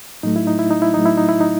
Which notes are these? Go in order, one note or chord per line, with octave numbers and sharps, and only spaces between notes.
A2 F#3 A3 D#4
E4
D#4
E4
D#4
E4
A2 F#3 A3 D#4
E4
D#4
E4
D#4